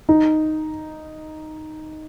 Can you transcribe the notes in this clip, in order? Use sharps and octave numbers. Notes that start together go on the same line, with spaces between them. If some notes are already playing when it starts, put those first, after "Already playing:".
D#4